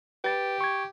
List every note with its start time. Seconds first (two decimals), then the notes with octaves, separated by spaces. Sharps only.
0.24 G4 B4 A6
0.61 C#6 G#6